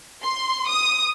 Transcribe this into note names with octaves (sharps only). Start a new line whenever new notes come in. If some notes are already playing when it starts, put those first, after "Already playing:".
C6
D#6